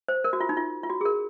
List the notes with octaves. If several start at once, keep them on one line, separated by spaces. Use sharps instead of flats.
C5
A#4
F#4
F4
D#4
F4
F4
F#4
G#4
A#4